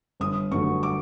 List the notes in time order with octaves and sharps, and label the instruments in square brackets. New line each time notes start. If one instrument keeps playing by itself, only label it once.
[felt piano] G1 D#6
G2 D3 F#3 A3 C#6
D6